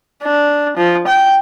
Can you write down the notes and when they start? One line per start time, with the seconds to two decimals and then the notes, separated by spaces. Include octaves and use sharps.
0.23 D4
0.77 F3
1.07 G5